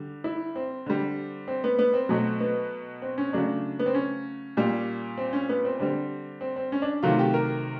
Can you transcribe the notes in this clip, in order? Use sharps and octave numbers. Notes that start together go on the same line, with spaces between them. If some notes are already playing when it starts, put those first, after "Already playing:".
Already playing: D3 G3
E4
C4
D3 G3
C4
B3
B3
C4
B2 F#3 A3
B3
C4
C#4
C#3 F#3 A3 D4
B3
C4
C#4
A#2 G3
C4
C#4
B3
C4
D3 G3 C4
C4
C4
C#4
D4
C3 D#3 F#3 A3 F4
G4
A#4